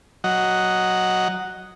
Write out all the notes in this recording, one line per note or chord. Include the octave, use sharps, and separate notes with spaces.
F#3 D#5 F#5